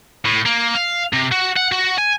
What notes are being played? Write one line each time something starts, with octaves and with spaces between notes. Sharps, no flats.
A2
A#3
F5
C3
F#4
F#5
F#4
G#5